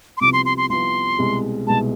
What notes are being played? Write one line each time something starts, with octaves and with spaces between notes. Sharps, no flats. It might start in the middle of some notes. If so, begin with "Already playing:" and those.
C6
C2 C3 F3 B3 D6
C6
C6
C6
C2 C3 F3 B3 C6
C2 B2 G#3
C2 B2 G#3 A5